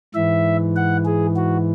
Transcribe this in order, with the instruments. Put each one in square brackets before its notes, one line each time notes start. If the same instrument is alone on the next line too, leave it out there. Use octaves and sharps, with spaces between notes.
[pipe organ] G#2 E3 E5
F#5
G#4
F#4